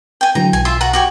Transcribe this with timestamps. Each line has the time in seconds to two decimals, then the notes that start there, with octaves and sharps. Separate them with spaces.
0.21 G5 G#5
0.35 D3 E3 F#3 A#5
0.53 B1 G#5
0.65 F4 E5 C6
0.81 F#4 F#5 A#5
0.93 F#4 G4 G#5